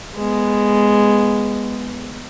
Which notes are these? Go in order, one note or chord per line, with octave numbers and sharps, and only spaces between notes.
G#3 B3